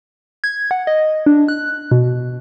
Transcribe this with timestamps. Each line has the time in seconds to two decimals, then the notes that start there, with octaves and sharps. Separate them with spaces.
0.44 G#6
0.71 F#5
0.87 D#5
1.26 D4
1.48 F#6
1.91 B2